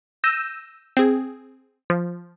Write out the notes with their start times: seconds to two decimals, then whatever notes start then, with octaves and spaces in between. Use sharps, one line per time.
0.24 E6 G6 A#6 D#7 E7
0.97 C4 G#4
1.90 F3